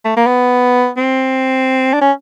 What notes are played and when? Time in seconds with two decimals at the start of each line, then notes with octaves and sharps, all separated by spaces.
0.05 A3
0.16 A#3
0.27 B3
0.97 C4
1.93 D4
2.01 C#4